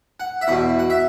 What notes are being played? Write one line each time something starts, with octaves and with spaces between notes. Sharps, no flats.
F#5
E5
E2 B2 F#5
F#5
E5